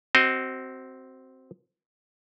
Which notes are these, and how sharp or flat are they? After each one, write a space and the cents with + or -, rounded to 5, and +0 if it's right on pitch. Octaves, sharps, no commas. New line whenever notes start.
C4 +0 F#4 +30 D#5 +0